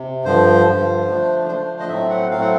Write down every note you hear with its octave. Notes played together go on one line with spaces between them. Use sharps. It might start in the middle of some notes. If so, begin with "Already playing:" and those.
Already playing: C3
G2 D3 F3 C5
G2 D3 F3
D3 F3 A3 D4
D3 F3 A3 D4 C5
D#5
A2 F#3 A3 C4 E5
F#5
A2 F#3 A3 C4 F5
F#5